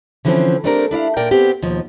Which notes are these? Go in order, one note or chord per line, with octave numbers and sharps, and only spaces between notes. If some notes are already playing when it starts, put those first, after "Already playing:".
D3 E3 F3 A3 C4 C#4
A3 C4 D4 G4 G#4 A#4
D4 E4 D5 F5
A#2 A#3 A#4 D5 G5
B3 C4 G4
D#2 B2 F3